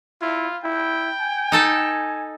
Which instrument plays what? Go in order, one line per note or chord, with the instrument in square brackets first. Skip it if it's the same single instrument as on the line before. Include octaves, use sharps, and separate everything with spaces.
[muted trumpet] E4 [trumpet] F4
[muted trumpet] E4 [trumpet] G5
[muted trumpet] G#5
[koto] D#4 A4 A5